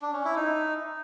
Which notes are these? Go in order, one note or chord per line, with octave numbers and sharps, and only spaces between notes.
D4
C#4
E4
D#4